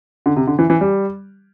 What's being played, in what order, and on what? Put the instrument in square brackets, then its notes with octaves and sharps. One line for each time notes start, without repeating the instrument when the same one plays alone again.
[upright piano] D3
C3
D3
E3
E3
G3